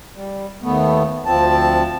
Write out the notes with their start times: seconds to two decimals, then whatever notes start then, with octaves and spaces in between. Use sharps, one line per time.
0.16 G3
0.63 D#2 A3 B3
1.26 D2 F3 C4 A5